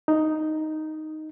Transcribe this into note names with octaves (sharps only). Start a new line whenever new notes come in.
D#4